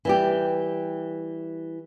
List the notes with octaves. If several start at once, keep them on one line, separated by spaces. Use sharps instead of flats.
E3 G3 G4